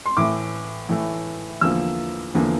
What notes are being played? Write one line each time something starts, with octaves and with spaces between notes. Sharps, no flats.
C6
A2 E3 A3 D6
A2 E3 A3
E2 D3 F3 A#3 E6
E2 D3 F3 A#3